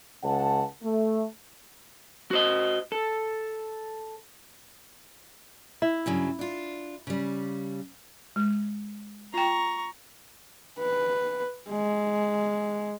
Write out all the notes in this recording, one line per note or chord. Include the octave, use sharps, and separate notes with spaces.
C#2 C#4 F#5 A5
A3
F#4 C5 D#5
A4
E4
G2 C#3 F#3
D4 F4
C#3 G3
G#3
F4 G5 A#5 C#6
B4
G#3